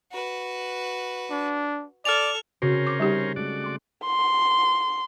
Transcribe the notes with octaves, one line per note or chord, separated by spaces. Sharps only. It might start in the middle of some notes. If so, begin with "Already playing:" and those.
F#4 B4
D4
A4 D5 F6 F7
C#3 C4 C#4 F#4 A#4 C5
D6
G3 D#4 G4
G#3 A3 F#4 D5
C6 D6
C6